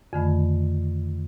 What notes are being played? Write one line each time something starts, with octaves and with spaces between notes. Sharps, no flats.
F2 D3 D#3 A3 B5